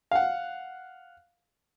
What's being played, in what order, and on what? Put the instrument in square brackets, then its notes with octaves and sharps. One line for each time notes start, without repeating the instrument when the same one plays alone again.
[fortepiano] F5 F#5